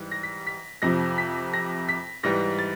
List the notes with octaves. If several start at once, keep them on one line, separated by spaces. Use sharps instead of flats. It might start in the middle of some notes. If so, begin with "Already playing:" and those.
Already playing: G#2 E3 G3
A#6
B6
B6
F2 C3 F3 A#6
B6
A#6
B6
G#2 E3 G3 A#6
A6